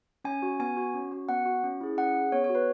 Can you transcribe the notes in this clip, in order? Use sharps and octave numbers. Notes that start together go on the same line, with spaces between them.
C#4 G#5
F#4
B3 G#5
F#4
C#4
F#4
B3 F#5
F#4
C#4
E4 G#4
C#4 F#5
G#4
B3 C#5
C#5
F#4
B4